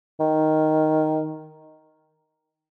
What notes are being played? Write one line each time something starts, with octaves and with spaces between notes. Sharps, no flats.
D#3